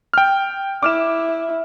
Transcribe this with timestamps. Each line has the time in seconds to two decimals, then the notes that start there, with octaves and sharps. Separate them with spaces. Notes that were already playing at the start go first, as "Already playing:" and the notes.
0.13 G5 F6
0.83 E4 D6 F6 E7